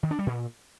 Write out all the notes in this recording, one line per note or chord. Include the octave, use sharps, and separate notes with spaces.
D#3
D4
G3
A#2